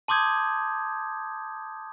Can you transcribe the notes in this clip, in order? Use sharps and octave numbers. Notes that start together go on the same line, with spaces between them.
A5 C6 D6 D#6 G6 G#6